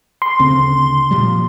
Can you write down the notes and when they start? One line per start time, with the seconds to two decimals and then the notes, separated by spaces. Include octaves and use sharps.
0.22 C6
0.39 D2 C#3 C4
1.11 A#2 F3 G3